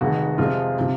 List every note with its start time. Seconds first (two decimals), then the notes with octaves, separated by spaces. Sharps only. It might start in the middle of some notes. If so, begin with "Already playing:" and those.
0.01 F1 F2 D#3 G#3 F#4
0.38 F2 C3 F3 G#3 F4
0.79 C3 F3